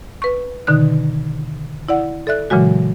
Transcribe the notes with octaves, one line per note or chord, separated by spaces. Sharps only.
B4 C#6
B2 D3 D#3 D#4 F#6
E4 D5 F#5
A4 D5 E5 F#6
A#2 C#3 E3 F#3 G#3 F#4